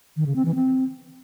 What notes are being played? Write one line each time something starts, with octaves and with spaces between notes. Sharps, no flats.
D#3
C#3
C4
E3
C4